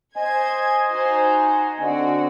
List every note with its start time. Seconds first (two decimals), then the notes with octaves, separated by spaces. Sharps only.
0.16 C5 D#5 G#5 G#6
0.90 D#4 F#4 C5
1.80 D3 C4 F#4